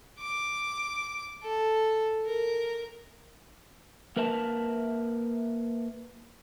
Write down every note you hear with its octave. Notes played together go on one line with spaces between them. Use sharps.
D6
A4
A#4
A#3 A#4 B4 E5 A5